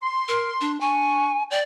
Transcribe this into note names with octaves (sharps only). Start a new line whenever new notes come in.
C6
A#4
D4
D4 G#5 C#6
D5 G5